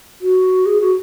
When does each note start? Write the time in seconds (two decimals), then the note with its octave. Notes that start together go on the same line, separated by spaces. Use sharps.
0.21 F#4
0.66 G#4
0.81 F#4